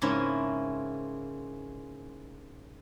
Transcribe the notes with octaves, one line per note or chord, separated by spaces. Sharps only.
G#2 C#3 A#3 C4 C#4 E4